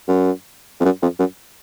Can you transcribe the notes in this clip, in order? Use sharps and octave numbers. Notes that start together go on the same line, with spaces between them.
F#2
F2
F#2
F2
F#2